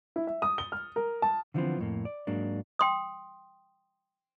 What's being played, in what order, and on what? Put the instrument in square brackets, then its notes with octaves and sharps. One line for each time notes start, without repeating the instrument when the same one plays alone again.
[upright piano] E4
E5
D#6
G7
F6
A#4
A5
[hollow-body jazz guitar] D3 E3 F3 A3 B3 C4
F2 A2 A#3
D5
G#2 F#3 A#3 D4
[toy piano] G5 C6 D#6